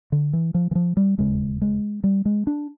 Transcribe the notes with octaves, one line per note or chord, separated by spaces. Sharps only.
D3
E3
F3
E3
F3
G3
E1 D#2 C#3 G#3
G#3
G3
G#3
D4